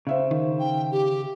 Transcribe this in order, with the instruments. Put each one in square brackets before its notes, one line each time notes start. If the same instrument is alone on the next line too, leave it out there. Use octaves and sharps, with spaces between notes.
[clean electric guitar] C#3 [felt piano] C5 E5 F5
[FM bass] D#3
[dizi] G5
G4